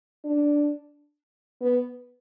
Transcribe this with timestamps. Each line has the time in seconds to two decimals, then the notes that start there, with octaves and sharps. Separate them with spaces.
0.25 D4
1.62 B3